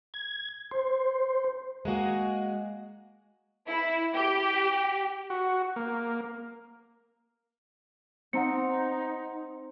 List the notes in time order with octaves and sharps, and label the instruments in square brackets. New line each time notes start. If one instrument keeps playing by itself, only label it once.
[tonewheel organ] G#6
C5
[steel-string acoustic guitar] G#3 A#3 F#4 G#4
[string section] E4
G4
[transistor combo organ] F#4
A#3
[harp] C4 [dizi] D#4 [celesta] F#5 A#5 C#7